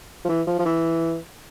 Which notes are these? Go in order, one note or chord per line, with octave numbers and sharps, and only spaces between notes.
F3
E3
F3
F3
E3